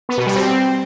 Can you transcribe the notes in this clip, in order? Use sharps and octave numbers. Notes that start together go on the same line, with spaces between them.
B3
B2
G3
C4